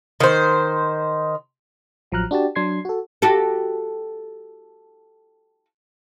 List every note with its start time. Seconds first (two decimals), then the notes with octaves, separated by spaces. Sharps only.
0.20 D#3 C5
2.12 A1 F3 F#3 A#5 F6 F#6
2.31 D4 F#4 G4 A5
2.55 F#3 D4 C6 G#6 C7
2.85 F#4 A4
3.22 F#4 G4 A4